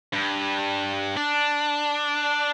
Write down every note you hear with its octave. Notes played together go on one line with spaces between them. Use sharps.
G2
D4